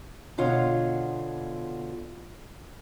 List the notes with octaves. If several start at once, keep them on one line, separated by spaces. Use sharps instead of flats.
B2 D3 F4 C#5 F#5